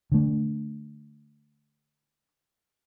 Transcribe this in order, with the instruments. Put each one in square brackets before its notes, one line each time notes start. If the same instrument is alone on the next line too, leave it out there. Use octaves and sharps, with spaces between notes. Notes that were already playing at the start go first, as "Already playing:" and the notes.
[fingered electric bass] D3 A3